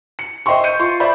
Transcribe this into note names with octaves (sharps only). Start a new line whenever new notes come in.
C#7
C5 D#5 E5 G5 C6 C#6
G6 C#7 D#7
F4 C6 C#6
C5 D5 E5 B5 G6